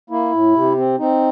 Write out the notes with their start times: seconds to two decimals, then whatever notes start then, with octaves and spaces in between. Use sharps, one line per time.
0.10 A#3 E4
0.32 A2
0.55 C3
0.77 C4
0.99 C4 D#4